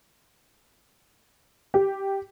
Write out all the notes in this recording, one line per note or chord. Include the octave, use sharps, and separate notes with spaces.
G4